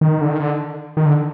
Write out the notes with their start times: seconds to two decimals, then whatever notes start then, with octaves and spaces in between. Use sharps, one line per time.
0.01 D#3
0.21 D3
0.30 D#3
0.40 D3
0.97 D#3
1.06 D3